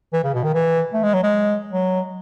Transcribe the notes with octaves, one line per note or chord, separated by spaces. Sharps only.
E3
C#3
B2
D#3
E3
A3
G#3
F#3
G#3
F#3